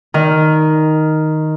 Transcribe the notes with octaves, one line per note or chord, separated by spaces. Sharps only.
D#3